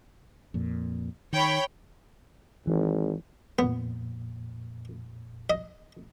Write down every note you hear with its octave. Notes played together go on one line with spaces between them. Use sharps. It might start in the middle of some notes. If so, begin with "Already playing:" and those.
F2 A#2
D#3 C#5 G5 B5
G#1 E3
F2 A#2 B3
D#5